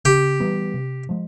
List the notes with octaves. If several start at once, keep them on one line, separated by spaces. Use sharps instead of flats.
C#3 G4
E3 G3 B3
C3
F3 G#3